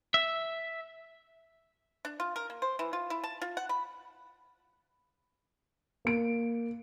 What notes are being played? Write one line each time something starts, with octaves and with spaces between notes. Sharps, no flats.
E5
D4
F4
A#4
A#3
C5
E3
F4
E4
A5
F4
F#5
B5
A#3 D7